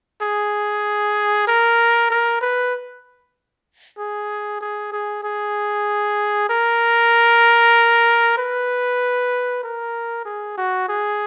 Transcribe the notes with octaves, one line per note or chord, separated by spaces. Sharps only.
G#4
A#4
A#4
B4
G#4
G#4
G#4
G#4
A#4
B4
A#4
G#4
F#4
G#4